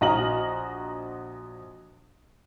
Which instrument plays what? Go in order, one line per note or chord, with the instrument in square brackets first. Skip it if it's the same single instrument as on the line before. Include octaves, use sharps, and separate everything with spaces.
[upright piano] A#1 F#4 D#5 A#5 F6 F#7